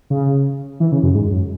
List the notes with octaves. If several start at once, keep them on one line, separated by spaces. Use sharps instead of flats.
C#3
E3
C#3
F#2
G#2
F#2